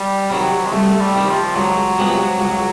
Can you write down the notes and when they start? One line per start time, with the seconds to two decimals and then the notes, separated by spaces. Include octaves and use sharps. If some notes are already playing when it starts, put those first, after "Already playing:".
Already playing: G3
0.30 C3 D#3 F#3
0.66 G#3
0.72 C2 A3
1.00 G3
1.15 C3 D#3
1.29 F3
1.56 C#2 F#3
1.98 C3 F3 G#3 B3
2.40 C#2